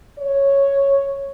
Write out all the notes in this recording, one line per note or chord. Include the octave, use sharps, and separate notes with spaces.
C#5